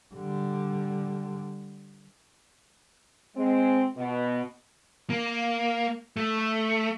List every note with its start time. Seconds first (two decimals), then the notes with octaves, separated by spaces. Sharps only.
0.15 D3 G3
3.35 G#3 C4
3.96 B2
5.10 A#3
6.17 A3